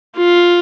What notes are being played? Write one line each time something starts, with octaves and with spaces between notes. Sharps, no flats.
F4